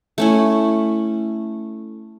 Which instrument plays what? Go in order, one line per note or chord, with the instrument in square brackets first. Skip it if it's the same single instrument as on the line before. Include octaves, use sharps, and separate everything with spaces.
[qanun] A3 C#4 E4